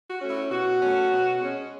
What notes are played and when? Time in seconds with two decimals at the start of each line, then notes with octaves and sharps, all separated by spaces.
0.10 F#4
0.20 A3 C#4
0.29 E4
0.49 B2 F#4
0.81 A3 C#4
1.10 B2
1.41 G#3 C#4